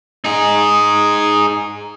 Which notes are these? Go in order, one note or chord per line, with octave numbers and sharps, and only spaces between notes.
D#4 G#4